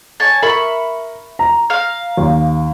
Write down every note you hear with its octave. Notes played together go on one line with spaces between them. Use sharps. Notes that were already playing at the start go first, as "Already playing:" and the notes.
C#5 G#5 A5
A#4 E5 B5 C#6
A#5
F5 F6
D#2